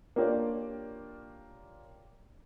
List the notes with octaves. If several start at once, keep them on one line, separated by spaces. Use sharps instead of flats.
A#3 D4 F4 G4 C#5 D5